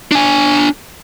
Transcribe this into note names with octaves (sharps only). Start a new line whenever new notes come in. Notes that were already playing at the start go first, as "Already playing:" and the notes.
D4 G#5